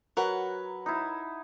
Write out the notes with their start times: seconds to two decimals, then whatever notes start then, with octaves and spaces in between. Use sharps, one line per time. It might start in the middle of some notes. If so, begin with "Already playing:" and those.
0.17 F#3 A#4 B4 F#5
0.86 D#4 E4